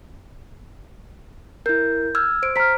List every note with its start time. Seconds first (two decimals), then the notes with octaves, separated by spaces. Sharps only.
1.66 E4 A#4 G6
2.15 E6 F6 G#6
2.43 C5 D7
2.56 C5 A#5 F6 B6